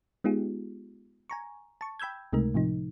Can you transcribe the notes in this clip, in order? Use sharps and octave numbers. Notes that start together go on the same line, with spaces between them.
G#3 B3 D#4 F4 G4 G#4
G#5 A#5 C#6
A5 C#6
G5 B5 E6 G6 G#6
C#2 C3 G#3 A3 D#4 A#4
A2 C3 F3 D#4